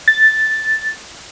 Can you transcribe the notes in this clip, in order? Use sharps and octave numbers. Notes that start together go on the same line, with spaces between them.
A6